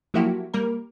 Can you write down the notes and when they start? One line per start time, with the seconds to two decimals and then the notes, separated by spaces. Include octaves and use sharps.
0.14 F3 F#3 A#3 E4 F#4 G4
0.54 G3 A#3 A#4